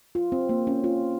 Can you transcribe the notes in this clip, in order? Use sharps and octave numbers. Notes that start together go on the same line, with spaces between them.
F4
C4
A#3
C#4
F4